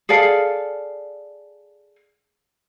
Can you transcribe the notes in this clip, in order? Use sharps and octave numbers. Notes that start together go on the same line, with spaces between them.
G#4 A4 D5 F5